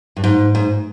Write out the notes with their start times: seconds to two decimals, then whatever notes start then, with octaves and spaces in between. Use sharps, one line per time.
0.17 G2
0.24 G#2
0.55 G#2